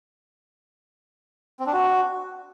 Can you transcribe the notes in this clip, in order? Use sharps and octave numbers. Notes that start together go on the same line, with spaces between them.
C4
D4
F#4